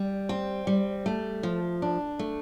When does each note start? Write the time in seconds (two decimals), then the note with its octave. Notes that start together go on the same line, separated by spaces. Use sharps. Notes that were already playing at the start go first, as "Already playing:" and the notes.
Already playing: G3
0.29 C4
0.67 G3
1.06 A3
1.43 F3
1.82 D4
2.19 A3